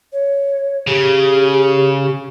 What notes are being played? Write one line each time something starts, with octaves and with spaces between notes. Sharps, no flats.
C#5
C#3 G4